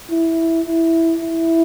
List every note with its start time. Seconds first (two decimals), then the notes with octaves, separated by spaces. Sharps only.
0.11 E4
0.66 E4
1.22 E4